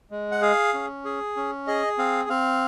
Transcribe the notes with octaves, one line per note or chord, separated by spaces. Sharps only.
G#3
F#5
G#4 F5
C#4
G#4
C#4
G#4 D#5
C4 F5
C4 F5